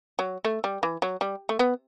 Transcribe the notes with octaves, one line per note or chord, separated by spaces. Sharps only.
F#3
A3
G3
E3
F#3
G3
A3
B3